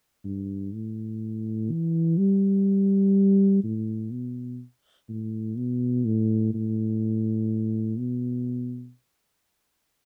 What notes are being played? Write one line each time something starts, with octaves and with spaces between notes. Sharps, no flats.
G2
A2
E3
G3
A2
B2
A2
B2
A2
A2
B2